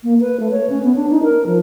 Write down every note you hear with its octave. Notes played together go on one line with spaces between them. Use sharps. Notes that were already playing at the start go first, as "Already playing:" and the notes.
A#3
B4
A3
C#5
C#4
B3
D4
D#4
A#4
F3